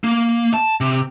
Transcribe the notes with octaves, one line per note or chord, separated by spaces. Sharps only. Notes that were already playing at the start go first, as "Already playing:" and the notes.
A#3
A5
C3